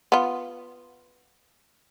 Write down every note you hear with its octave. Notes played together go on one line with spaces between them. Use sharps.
B3 F4